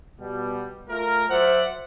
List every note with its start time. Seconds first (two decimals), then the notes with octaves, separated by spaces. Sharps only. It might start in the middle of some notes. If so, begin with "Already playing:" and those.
0.20 B2 G3
0.89 A3 F4 A#4
1.30 F#3 C5 D5 E5 F#5